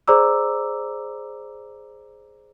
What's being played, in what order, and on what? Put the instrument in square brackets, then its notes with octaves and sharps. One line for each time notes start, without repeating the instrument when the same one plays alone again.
[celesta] G#4 C5 D5 A#5 D6 E6